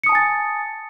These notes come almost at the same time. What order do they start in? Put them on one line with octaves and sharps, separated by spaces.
C#7 D#6 A5 G#5 A6